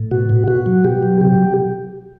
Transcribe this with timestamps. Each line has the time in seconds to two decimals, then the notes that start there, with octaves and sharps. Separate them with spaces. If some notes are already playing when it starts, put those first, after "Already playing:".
Already playing: A2
0.11 B2 F#4
0.29 B2
0.48 B2 F#4
0.66 F#3
0.84 B2 G4
1.03 F#3
1.21 C3 G4